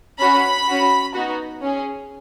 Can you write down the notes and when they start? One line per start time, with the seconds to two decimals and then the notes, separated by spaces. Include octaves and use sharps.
0.19 C#4 F#4 B5
0.67 C#4 F#4
1.14 B3 D#4 F#4
1.62 C#4 G#4